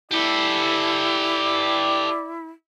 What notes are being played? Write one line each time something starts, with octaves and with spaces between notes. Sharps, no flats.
E4 G4 A4 D5